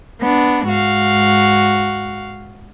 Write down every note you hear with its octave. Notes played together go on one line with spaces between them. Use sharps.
B3 D4
G#2 F#4 F5